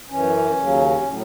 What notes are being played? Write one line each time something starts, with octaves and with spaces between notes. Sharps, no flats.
F#2 E3 C#4
D#2 C#3 F#3
A2
F#3